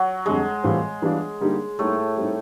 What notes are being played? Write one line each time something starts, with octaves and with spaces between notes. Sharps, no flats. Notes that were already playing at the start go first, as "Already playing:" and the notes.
Already playing: F#3
F2 D3 G3 G#3
A2 E3 G3 C4 F4
E3 G3 B3 D4 F4
D3 G3 A#3 D#4 G4
A2 G3 A3 A#3 D#4
G3 C4 D#4